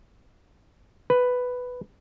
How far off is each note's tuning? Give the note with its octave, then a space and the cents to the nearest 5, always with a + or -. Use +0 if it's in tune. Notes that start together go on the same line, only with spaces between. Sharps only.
B4 +5